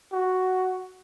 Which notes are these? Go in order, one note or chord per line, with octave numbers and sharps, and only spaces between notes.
F#4